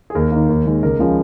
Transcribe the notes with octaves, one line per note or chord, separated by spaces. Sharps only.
G#4
D#2 A#4
D#3 A#3
D#2
D#3 G#3
C#2 A#4
C#3 F3 G#3